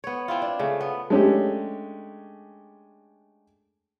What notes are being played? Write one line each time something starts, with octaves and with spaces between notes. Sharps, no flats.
B3 C#5
C4 E4 F4
D4
C#3 A3
B3
G#3 A3 C#4 D4 G4